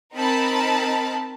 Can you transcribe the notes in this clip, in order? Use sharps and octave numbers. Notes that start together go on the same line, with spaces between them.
C4 D#4 A#4 A5 B5